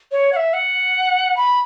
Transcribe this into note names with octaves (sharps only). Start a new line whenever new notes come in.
C#5
F#5
E5
F#5
B5